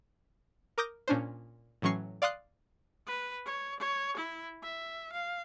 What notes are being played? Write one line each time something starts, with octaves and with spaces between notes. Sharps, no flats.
A#4 D6 D#6 G6 A#6
A#2 C#4 D4 C5
A2 E3 F#3 C#4 C#6 C7
D5 F5 C6 D#6 F#6 C7
B4
C#5
C#5
E4
E5
F5